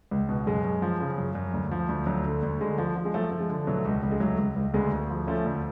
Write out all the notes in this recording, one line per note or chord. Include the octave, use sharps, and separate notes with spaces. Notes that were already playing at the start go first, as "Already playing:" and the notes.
C#2
B2
F#2 G#3
F#2
F3
C#3
F#2
F#2
D2
F3
D2
D2 F#3
D3
D2
D3 G#3
F3
F3
G#3
F3 F#3 A3
F3 A3
G#3
D3
B2 F#3 A3
C#2
C#2
G#3
C#2 F#3 A3
C#2
C#2
D2 G#3 B3
D2
F3
F3 A3 C#4
D2